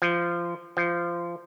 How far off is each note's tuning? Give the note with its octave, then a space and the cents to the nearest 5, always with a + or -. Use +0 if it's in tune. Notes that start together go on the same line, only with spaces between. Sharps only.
F3 -20
F3 -20